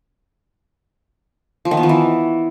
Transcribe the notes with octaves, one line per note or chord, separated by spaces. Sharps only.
F3
D#3
B3
F3
E3